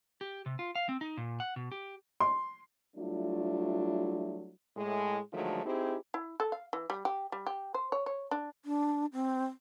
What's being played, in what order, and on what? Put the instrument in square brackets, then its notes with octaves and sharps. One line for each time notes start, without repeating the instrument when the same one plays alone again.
[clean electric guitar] G4
C3
F4
F5
C4
D#4
A#2
F#5
B2
G4
[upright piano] C6
[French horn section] F#3 G3 A3 D4 E4 F4
A2 G#3
D3 D#3 F3 F#3 G#3 A3
C4 D#4 E4 G4 G#4 C5
[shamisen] E4
A4
F5
E3
G3
G4
G3
G4
C5
C#5
C#5
D4
[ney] D4
C4